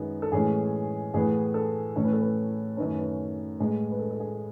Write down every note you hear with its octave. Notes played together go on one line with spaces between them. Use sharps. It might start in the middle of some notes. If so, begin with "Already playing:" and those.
Already playing: F#2 D#3 G#3 B3
A4
A2 E3 G#3 C#4 G#4
A2 E3 B3 G#4
A4
A2 E3 A3 C#4 C#5
B4
A4
B4
F#2 D#3 A3 C#4 B4
B4
A2 G#3 B3
B4
A4
A4
G#4